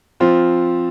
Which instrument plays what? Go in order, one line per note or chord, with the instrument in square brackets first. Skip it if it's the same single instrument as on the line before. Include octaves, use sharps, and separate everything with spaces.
[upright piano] F3 C4 F4